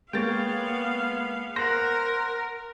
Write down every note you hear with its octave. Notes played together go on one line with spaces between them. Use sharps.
G#3 A#3 B3 C#5 F5 G5 A6
A#4 C5 F#5 A#6